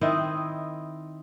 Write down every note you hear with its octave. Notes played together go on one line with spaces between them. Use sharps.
D#3 C4 E4 D#5